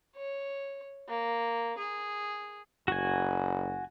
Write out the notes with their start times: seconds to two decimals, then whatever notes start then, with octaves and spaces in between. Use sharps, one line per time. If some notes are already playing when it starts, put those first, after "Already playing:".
0.16 C#5
1.09 A#3
1.78 G#4
2.88 F#1 F#4 G#5